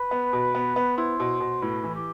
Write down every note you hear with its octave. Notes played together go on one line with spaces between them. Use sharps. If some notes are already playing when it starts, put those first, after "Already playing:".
Already playing: B4
B3
B2
B3
B3
E4 C5
B2
B2
A2 B4
E3
G4